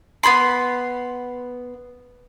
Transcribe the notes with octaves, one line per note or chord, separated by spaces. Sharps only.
B3 G#4 B5 C6